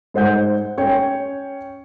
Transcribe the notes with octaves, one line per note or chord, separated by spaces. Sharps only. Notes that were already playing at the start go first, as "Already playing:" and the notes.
G#2 C5 F#5 G6
C#4 C#5 G5